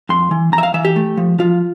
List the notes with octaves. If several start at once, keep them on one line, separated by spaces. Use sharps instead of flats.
F2 C6
E3
F2 A#5
E5
F5
E3 E5
G4
A3
F3
F3 F4